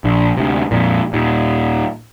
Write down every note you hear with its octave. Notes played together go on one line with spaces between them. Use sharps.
A#1
D2 C3
F2 A#2
D#2 A#2